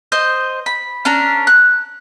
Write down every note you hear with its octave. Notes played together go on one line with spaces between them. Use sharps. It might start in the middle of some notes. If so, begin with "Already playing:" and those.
C5 D#5 G6
B5
C#4 D4 A#4
F#6